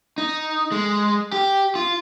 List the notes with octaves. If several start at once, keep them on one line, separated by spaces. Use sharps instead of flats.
D#4
G#3
G4
F4